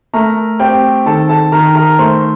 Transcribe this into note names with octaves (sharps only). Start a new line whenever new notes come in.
A3 A#4 A#5
C4 G4 G5
D#3 A4 A5
A4 A5
D#3 A#4 A#5
A#4 A#5
A3 C5 C6